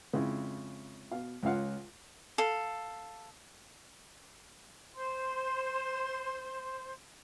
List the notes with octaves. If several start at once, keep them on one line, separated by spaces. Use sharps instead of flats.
F2 C#3 G#3 E4
B2 F5
C#2 C#4 F4 F5 F#5
A4 F5
C5 C6